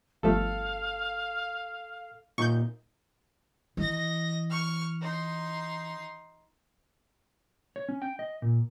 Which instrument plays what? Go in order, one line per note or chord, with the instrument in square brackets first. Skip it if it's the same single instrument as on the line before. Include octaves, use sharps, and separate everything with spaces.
[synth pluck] G1 F3 A3 [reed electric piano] A4 [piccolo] F5
[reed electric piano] A#2 D#4 [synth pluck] C#6 G6
[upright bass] E3 [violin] D#5 A#6
[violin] C#6 F6
D#4 C6
[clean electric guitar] C#5
C#4
G5
D#5
A#2